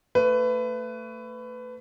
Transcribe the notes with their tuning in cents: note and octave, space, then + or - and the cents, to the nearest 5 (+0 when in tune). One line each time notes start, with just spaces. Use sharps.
A3 +30 B4 +20